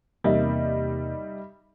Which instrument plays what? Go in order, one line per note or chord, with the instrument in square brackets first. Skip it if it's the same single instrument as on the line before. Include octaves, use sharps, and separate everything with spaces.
[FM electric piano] E2 C3 A#3 [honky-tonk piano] G3 D#4 E5